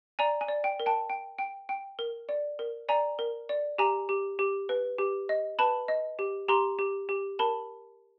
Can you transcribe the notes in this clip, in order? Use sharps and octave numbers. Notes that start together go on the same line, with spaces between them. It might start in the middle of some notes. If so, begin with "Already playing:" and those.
D5 G#5 A#5
G#5
D5
G5
A#4
G5 A5
G5
G5
G5
A#4
D5
A#4
D5 G#5 A#5
A#4
D5
G4 G#5 A#5
G4
G4
B4
G4
D#5
B4 A5 B5
D#5
G4
G4 A#5 C6
G4
G4
A#4 A5 B5